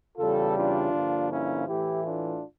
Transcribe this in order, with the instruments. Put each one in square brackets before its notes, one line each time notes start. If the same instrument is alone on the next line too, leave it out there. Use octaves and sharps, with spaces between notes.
[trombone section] E2 C#3 E3 G3 F4 A4
D4 F4
G2 D3 F3 A#3
C#4 E4
A2 E3 A3 E4 G4
D4 F4